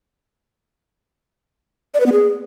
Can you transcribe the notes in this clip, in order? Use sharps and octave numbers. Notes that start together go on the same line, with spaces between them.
D5
B4
B3
G#4